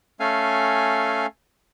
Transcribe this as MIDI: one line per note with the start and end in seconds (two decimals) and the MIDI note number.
0.20 1.26 57
0.20 1.26 61
0.20 1.26 69
0.20 1.26 77
0.20 1.26 80